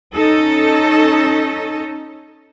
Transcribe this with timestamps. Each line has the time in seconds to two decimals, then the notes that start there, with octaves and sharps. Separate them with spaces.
0.14 C#4 D#4 A4